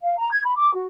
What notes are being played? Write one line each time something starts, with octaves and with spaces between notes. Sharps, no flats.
F5
A#5
G#6
B5
D6
F#4